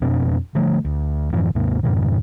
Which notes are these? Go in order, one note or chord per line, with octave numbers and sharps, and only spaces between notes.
F2 B2 C4 D4
D3 F3 A3
D2
F2 G#2 E3
D#2 G#2 C3 A#3
F2 G#2 B2 D#3